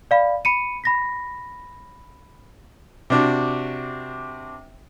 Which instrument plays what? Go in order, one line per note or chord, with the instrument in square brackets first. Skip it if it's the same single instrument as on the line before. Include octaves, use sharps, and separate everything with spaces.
[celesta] D5 F5 B5
B5 C#7 D#7
B5 A#6 B6
[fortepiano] C3 D4 F#4